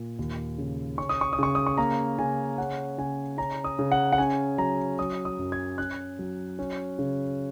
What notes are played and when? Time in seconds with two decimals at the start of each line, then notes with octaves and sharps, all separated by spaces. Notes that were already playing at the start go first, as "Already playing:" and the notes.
Already playing: A#2
0.19 D#2
0.58 C#3
0.98 C#4 C#6
1.09 D#6
1.21 C#6
1.33 D#6
1.39 C#3 C#6
1.55 D#6
1.67 C#6
1.78 A#3 A#5
2.19 C#3 G#5
2.58 C#4 F#5
2.98 C#3 G#5
3.38 C#4 A#5
3.64 D#6
3.79 C#3
3.92 F#5
4.13 F#5
4.18 C#4 G#5
4.58 F#3 A#5
4.99 F#3 D#6
5.25 D#6
5.39 F#2
5.52 G#6
5.78 C#4 F#6
6.19 F#3
6.59 C#4
6.99 C#3